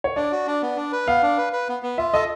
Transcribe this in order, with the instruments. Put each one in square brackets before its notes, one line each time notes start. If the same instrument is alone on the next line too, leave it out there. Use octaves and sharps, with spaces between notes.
[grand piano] C#5
[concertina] D4 [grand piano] D5
[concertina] F#4
D4
B3
D4
B4
[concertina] B3 [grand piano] F5
[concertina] D4
B4
B4
B3
B3
[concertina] F4 [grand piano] E5
[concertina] A4 [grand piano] D#5